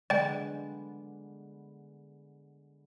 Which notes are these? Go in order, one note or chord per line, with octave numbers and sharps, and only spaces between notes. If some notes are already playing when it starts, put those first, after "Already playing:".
D3 G#3 B3 D5 G5